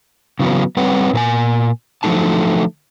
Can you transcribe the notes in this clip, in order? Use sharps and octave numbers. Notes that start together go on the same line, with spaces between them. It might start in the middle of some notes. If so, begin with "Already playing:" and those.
C#3 E3 F#3 B3 C#4
G3 C4 B4 C#5 F#5
A#2 B4 G#5
D3 F3 F#3 A3 D#4 A5